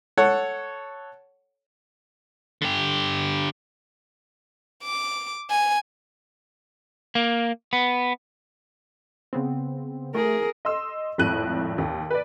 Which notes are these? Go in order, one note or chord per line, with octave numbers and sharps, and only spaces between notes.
A4 C#5 F#5
D3 G4
D6
G#5
A#3
B3
C#3 B3 C4
A3 G#4 A#4
D#5 C6 E6
G#1 F2 A2 F#6 D#7
D#2
B4 D5